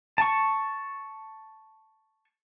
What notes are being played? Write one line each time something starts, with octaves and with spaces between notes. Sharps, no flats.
A5 C#6